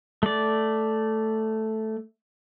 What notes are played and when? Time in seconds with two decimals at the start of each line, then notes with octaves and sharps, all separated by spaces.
0.23 A3 D5